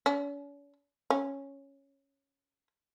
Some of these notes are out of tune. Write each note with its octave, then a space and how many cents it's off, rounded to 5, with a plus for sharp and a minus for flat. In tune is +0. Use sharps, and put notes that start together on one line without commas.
C#4 +45
C#4 -5